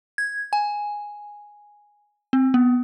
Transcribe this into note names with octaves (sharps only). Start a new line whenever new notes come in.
G#6
G#5
C4
B3